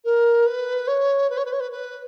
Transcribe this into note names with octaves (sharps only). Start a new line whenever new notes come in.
A#4
B4
C#5
B4
C#5
B4
C#5
B4
B4